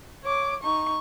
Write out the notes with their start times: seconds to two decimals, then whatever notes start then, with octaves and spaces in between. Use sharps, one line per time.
0.24 C#5 D6
0.63 D#4 C#6